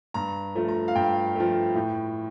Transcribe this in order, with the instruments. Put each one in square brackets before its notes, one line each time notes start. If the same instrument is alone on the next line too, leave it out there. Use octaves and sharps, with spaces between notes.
[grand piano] G2 A#5
F3 A3
A#5
F5
G2 G5
F3 A3
A2